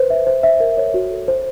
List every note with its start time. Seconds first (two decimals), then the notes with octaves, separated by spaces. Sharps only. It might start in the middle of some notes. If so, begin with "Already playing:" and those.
Already playing: B4 C5
0.10 E5
0.27 C5
0.43 E5
0.60 A#4
0.77 C#5
0.94 F#4
1.11 A4
1.28 C5